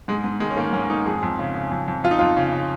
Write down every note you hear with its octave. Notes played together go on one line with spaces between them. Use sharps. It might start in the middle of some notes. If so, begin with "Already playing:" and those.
G#2 G#3
G#2
D#3 G#3
C#4
D#3 A#3
G#2 C#4
G#2 D#4
F2 G#4
F2
C#3
C#3
F2
F2
F2 F4
D#4
F2 F4
C#3
C#3